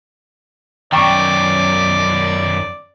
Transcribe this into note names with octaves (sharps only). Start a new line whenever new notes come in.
F#2 D#3 D5 G5 A#5 C#6